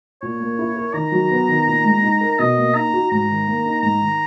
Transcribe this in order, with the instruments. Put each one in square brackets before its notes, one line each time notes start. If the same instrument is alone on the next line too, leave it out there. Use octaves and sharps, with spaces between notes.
[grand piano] A#2 [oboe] C#5
[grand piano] A#3
E4
A#4
[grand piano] D#3 [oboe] A#5
[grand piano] F#3
B3
D#3
A#2
G#3
D#4
A#4
[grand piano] B2 [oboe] D#5
[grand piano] A#3
[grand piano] D#4 [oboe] A#5
[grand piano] F#4
[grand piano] G#2 [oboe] A#5
[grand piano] D#3
A#3
D#4
[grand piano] G#2 [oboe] A#5
[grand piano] D#3